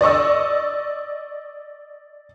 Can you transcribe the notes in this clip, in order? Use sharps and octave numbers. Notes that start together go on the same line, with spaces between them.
D5 D#5 C#6 E6